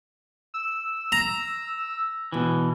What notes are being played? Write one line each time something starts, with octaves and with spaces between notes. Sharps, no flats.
E6
A#5
B2 E3